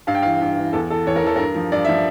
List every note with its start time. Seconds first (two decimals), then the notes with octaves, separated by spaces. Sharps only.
0.07 G2 F5
0.15 G5
0.22 E3 F5
0.41 G2
0.58 E3
0.73 E2 A4
0.90 E3 A4
1.06 E2 C#5
1.16 A#4
1.23 E3 A4
1.36 G2 A#4
1.55 F3
1.72 G2 D5
1.85 F3 E5